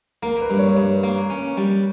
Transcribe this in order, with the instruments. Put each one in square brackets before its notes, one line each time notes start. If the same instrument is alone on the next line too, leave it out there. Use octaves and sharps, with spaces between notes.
[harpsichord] A#3 [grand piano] A#4
[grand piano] B4
[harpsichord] G2
[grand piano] C#5
[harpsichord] G2
A#3
C#4
G3